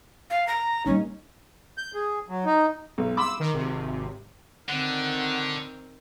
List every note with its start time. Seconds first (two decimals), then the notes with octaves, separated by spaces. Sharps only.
0.30 F5
0.47 A#5
0.86 G3 A#3 C#4 D#4
1.78 G6
1.95 G#4
2.29 F#3
2.45 D#4
2.98 B1
3.17 B5 C6 D6 E6
3.40 D#3
3.54 G#1 C3
4.69 D3 D#3 C4 F#5